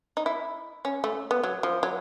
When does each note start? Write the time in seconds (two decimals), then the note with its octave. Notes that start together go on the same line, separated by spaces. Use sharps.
0.17 D#4
0.26 E4
0.85 C#4
1.04 A3
1.31 B3
1.44 F#3
1.63 F3
1.83 F#3